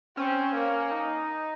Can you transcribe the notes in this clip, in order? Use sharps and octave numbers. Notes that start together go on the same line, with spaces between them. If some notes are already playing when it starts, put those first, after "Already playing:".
C4 C#4
A#3
D#4